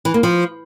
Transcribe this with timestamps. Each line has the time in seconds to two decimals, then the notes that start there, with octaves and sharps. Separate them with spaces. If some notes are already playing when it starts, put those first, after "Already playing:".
0.05 E3
0.14 A#3
0.23 F3